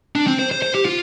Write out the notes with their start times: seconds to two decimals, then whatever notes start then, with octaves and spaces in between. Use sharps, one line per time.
0.15 D4
0.27 C4
0.39 C5
0.51 C5
0.62 C5
0.75 G4
0.85 F4